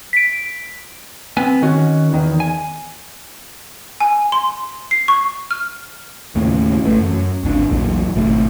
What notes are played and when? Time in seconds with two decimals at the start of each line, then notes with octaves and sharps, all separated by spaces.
0.13 B6 D7
1.37 B3 C4 G#5
1.62 D#3 C#4 F#4
2.13 E2 D#3
2.40 G#5
4.00 G#5
4.32 C6
4.91 C7
5.08 C#6
5.51 F6
6.35 D#2 A2 C#3
6.84 A1 E3 A3
7.00 F#2
7.43 D1 G#1 D4
7.69 A#1 E2 A#2 F#3
8.16 G#1 B2 A3